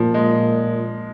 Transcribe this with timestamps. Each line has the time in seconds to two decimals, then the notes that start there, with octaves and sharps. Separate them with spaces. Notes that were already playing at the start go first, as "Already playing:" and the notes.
Already playing: A#2 F3
0.14 G#3